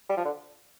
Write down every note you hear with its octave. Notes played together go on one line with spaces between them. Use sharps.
G3
F3
D3